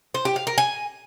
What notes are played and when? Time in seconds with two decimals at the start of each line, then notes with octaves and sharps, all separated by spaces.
0.14 C5
0.25 G4
0.36 F5
0.47 A#4
0.58 G#5